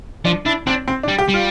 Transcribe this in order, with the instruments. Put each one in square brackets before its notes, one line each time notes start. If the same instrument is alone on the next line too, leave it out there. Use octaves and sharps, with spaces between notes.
[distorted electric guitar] F3 [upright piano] D4
[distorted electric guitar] D4 [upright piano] E4
[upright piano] C4 [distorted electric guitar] D4
[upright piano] C4
D4
[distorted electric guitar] G3
[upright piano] G4
[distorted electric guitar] G3
[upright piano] F4